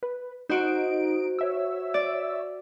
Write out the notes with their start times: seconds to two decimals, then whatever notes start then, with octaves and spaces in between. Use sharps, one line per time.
0.03 B4
0.49 D#4 F#4 C5 D#5 D7
1.39 C#5 E5 E6
1.94 D5